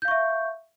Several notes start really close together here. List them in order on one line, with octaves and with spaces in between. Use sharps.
G6 F5 C#6 E5